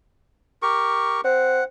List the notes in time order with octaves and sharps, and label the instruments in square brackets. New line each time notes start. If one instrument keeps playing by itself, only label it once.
[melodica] G4 A#4 C#6
[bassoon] C4 [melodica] F#5